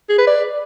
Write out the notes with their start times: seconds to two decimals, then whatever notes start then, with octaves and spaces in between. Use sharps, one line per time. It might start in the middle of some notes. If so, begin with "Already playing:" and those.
0.09 G#4
0.18 B4
0.27 D5